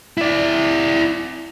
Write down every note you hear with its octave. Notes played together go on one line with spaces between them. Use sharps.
E4 D5